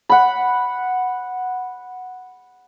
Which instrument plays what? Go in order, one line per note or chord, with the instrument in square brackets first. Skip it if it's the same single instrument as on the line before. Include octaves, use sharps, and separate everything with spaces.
[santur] F#5 B5